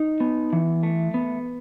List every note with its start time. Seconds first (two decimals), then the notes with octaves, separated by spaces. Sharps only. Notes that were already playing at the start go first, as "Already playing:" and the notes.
Already playing: D#4
0.20 B3
0.53 E3
0.83 A3
1.14 B3